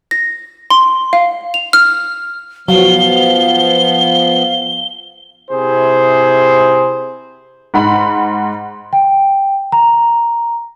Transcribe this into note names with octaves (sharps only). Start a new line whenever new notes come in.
A#6
C6
F5
F7
F6
F3 F#3 B3 F5 G7
C3 E4 G#4 C5
G#2 F#5 B5
G5
A#5